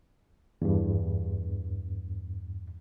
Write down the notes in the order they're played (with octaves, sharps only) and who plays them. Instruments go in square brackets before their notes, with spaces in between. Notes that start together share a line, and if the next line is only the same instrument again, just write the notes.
[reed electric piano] E2 G2